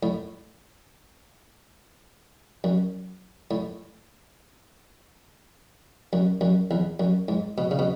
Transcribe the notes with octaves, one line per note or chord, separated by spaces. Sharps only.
A2
F#2
A2
F#2
F#2
E2
F#2
G#2
B2
C#3
B2